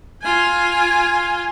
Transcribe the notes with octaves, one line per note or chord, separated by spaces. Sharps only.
F4 G#5